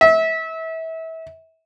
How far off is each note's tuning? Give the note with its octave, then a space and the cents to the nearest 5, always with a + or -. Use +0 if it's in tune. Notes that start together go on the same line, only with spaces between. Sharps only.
E5 -30